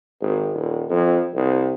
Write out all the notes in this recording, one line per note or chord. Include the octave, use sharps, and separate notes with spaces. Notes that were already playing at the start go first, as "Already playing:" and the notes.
G#1
D#1
F2
C2